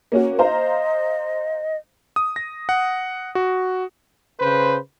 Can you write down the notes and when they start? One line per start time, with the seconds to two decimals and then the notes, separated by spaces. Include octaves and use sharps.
0.12 A#3 C#4 F#4
0.39 C5 D#5 F5 A#5
2.16 D#6
2.36 A#6
2.69 F#5
3.35 F#4
4.40 C#3 B4 C5